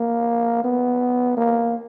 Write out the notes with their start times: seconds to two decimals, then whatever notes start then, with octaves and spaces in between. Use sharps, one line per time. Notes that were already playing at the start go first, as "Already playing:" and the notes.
Already playing: A#3
0.64 B3
1.37 A#3